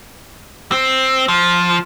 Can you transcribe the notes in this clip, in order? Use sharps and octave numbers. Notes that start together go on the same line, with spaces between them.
C4
F3